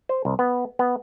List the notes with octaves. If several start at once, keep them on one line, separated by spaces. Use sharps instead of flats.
C5
C2
B3
B3